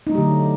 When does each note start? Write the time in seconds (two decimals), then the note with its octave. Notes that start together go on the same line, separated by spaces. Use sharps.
0.07 D#4
0.09 A3
0.12 F#3
0.15 G4
0.18 D3